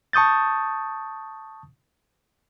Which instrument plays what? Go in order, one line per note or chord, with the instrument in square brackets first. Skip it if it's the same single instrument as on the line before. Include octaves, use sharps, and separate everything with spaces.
[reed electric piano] A5 C#6 D#6 G6 A6